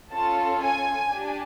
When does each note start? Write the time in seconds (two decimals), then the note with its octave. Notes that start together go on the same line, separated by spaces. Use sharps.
0.12 C#4 F4 A4 A5
0.61 G#5
1.11 D4 G4